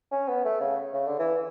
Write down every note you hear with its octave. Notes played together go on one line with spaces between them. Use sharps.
C#4
B3
A3
C#3
C#3
D3
E3